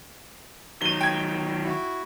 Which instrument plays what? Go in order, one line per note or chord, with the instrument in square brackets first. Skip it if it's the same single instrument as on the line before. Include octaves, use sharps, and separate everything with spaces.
[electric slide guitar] D#3 F#3 [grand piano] D#7 G7
[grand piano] G5 G#6
[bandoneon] E4 F#4